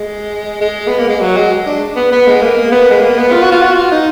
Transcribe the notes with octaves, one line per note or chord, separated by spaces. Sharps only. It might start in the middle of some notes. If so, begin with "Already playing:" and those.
Already playing: G#3
G#3
B3
A#3
G#3
F#3
G#3
D4
B3
B3
G#3
A#3
B3
G#3
A#3
B3
F4
F#4
F4
F#4
F4
D#4